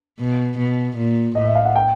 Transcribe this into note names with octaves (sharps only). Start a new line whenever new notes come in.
B2
B2
A#2
A2 D#5
E5
F5
F#5
G5